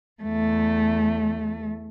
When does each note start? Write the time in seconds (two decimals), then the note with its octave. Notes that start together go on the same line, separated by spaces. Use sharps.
0.23 E2 A3